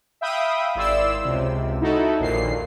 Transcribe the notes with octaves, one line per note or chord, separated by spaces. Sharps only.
E5 F5 G5 B5 D#6
G#1 E4 D5 C6 E6
C#2 C3
D#4 E4 F#4 A4
A#1 D#2 A#2 C7